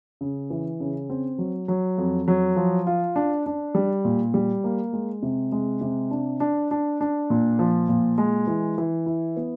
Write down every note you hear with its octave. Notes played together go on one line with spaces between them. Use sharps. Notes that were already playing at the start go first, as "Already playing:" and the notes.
C#3
E3
C#3
C4
F#3
F#3
F2
F#3
F3
F4
D4
D4
G3
A#2
G3
A#3
G#3
C3
G#3
C3
D4
D4
D4
D4
A#2
F3
A#2
G#3
E3
E3
E4
B3